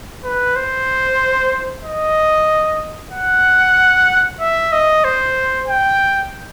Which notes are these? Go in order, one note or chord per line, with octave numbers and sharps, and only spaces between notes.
B4
C5
D#5
F#5
E5
D#5
C5
G5